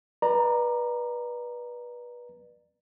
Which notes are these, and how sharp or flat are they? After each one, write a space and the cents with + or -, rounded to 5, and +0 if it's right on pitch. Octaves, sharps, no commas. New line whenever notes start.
B4 -25 D5 +30 A#5 +0